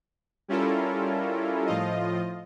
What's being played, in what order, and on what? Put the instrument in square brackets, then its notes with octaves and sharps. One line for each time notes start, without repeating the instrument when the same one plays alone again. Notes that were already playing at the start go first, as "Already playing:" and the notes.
[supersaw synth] G3 C#4 E4 F4 A4 A#4
A2 F3 F4 D#5